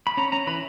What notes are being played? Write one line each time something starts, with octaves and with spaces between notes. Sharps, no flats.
B5
C#4 A#5
C#4 A#5
E3 B5